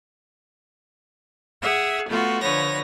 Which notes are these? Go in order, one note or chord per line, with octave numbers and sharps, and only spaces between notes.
G#4 E5 F#5
A3 B3 F4 F#4
D3 F3 B4 C#5 A#6